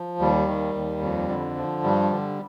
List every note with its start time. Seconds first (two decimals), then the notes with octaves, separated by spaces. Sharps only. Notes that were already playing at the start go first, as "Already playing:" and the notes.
Already playing: F3
0.19 D#2 G3
0.48 D#3
0.74 D#2
1.02 F2
1.28 D3
1.57 F3
1.84 G2 G3
2.11 D3